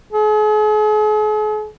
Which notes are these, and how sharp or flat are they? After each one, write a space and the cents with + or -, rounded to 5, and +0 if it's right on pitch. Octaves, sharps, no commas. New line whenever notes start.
G#4 +45